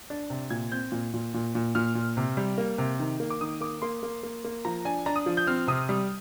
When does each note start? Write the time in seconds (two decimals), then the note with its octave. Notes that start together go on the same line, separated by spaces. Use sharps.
0.10 D4
0.30 C3
0.50 A#2 G#6
0.72 C4 G6
0.92 A#2
1.14 A#2
1.34 A#2
1.55 A#2
1.75 A#2 F6
1.95 A#2
2.17 C3
2.37 G3
2.58 A#3
2.78 C3
2.99 D#3
3.20 A#3
3.30 D6
3.41 D#3 D#6
3.61 A#3 D6
3.82 A#3 C6
4.03 A#3
4.23 A#3
4.44 A#3
4.65 F3 A#5
4.85 D4 G#5
5.06 D4 A#5
5.16 D#6
5.26 F3
5.37 G6
5.47 C4 F6
5.67 C3 D#6
5.89 G3